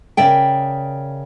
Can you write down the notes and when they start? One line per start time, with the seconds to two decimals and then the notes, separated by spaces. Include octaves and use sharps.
0.17 C#3 A#4 D5 E5 G5